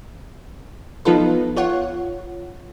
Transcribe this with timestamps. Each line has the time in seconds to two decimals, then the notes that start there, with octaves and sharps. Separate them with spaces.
1.05 F3 B3 D#4 F4 A4 B4
1.57 F4 C#5 F#5